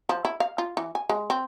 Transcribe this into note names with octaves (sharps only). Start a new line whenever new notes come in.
F3
E4
F5
F4
E3
G#5
G#3
C4